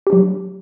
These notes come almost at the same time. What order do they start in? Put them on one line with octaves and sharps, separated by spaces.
G4 D4 F#3